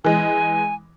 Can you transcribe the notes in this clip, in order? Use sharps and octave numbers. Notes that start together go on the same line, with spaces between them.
E3 G#3 G#5